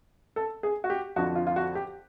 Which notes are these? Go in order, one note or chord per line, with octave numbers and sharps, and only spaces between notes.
A4
G#4
F#4
G4
F2 D3 F3 F#4
F4
F4
F#4
G4